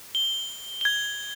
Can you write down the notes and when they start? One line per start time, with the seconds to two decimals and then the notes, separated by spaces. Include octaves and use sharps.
0.15 G7
0.81 G#6 G7